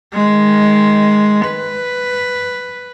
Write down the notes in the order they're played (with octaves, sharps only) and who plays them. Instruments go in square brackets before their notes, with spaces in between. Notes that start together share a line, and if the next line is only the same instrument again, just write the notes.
[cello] D#3 G#3
B4